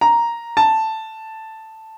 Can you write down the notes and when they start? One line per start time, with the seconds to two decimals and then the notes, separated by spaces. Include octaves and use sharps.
0.01 A#5
0.57 A5